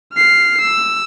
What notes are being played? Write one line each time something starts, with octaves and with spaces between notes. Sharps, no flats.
F6 C7
E6